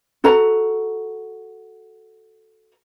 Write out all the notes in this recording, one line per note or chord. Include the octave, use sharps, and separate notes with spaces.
F#4 A4 A#5